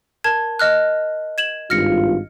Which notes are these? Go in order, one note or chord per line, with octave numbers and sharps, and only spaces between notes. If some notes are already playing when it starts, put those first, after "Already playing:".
A#4 A5 G#6
D#5 F6 F#6
G#6 E7 F#7
G#1 G2 F4 F6 A#6 C#7